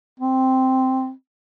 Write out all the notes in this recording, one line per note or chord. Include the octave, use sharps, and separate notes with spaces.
C4